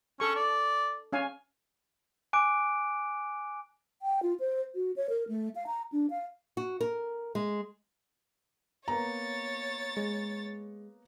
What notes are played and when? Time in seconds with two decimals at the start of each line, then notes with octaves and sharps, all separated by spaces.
0.20 C#4 A4 C#6
0.36 D5
1.12 C#4 F5 G#5
2.33 G#5 D6 F#6 D7
4.02 G5
4.23 F4
4.40 C5
4.75 F#4
4.96 C#5
5.09 A#4
5.29 A3
5.55 F5
5.67 A#5
5.92 D4
6.10 F5
6.57 F#4
6.81 A#4
7.35 G#3
8.88 A#3 B3 C#5 A#5 A6
9.97 G#3